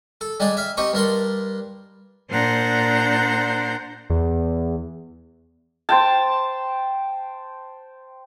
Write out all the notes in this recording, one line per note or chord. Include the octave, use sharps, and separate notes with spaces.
A4
G3 G#3 D4 D5
E5 F5
C4 D#4 G4 C#6
G2 D4 A#4 C6
A#2 D4 C5 F#5 A#5 G6
E2
C5 G5 A5